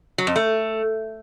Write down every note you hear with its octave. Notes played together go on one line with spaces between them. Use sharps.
F#3
F2
A3